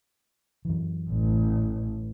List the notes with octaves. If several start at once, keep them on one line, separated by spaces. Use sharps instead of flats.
F#2 E3
A1